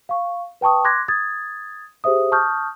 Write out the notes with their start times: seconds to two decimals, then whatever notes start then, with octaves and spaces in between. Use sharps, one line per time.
0.09 F5 C#6
0.61 B4 G5 A5 C#6 D#6
0.84 C6 D6 F#6 G#6 A#6
1.08 D#6 G#6 A6
2.04 G4 G#4 C5 E5 D#6
2.32 A5 C#6 D#6 F6 G6